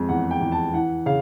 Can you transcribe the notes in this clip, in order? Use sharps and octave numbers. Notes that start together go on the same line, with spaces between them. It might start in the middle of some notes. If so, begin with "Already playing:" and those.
Already playing: F2 G#3
E2 F#5
G5
E2
A5
E3 F#5
C#3 F5